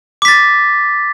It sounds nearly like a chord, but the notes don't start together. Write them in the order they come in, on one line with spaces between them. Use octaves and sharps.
D6 B6 A6